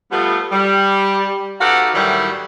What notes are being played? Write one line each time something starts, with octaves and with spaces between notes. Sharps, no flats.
F3 G3 A3 B3
G3
D#4 F#4 G4 A4 B4 F5
A2 D#3 E3 F#3 G3